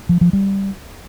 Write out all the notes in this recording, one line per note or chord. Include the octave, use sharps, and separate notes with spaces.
F3
F3
G3